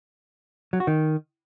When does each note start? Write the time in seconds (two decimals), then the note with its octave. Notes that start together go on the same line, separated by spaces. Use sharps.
0.73 F#3
0.80 F#4
0.87 D#3